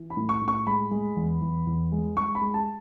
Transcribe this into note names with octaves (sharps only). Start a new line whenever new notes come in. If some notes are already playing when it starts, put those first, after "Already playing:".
Already playing: E3
B5
A2
C#6
A2
C#6
G#3 B5
G#3
E2
E2
E2
G#3
G#3 C#6
B5
G#3
A5